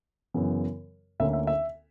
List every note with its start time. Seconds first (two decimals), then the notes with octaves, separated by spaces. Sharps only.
0.34 F#2 C#3 E3 B3
1.20 D2 D3 A#3 C#4 E5
1.33 E5
1.47 E5